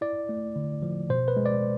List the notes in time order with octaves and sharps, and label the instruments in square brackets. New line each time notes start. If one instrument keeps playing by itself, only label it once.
[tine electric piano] E4 D5
A3
D3
F3
B2 C5
B4
G#3
D5